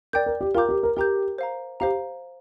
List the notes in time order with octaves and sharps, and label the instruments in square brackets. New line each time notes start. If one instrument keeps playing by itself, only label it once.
[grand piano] A#4 [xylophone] D5 G5 D6 G6
[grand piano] A#4
G4
[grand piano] F4 [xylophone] A#4 G5 A#5 D6 G6
[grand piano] G4
A#4
[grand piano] G4 [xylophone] A#4 G5 A#5 D6 G6
[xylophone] C5 F5 A#5
[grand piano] G4 [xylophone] C5 F5 A#5